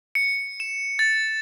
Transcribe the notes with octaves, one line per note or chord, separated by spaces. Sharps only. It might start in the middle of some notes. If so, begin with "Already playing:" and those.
C#7
E7
A6